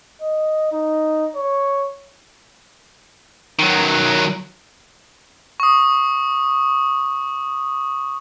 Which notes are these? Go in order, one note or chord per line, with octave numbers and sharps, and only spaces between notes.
D#5
D#4
C#5
D#3 F#3
C#6 D#6